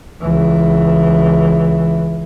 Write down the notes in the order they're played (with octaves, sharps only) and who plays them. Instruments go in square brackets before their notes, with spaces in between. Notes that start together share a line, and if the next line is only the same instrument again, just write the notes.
[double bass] C#2 E3